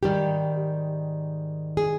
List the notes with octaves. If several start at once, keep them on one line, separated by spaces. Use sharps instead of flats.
G#2 D#3 G3 G4
G#4